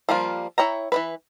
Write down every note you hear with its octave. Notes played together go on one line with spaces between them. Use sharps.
F3 G3 A#3 F4
E4 C#5 G5 A#5
E3 F3 B4